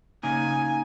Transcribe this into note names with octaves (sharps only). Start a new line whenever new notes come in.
C#3 A#3 D#4 G#5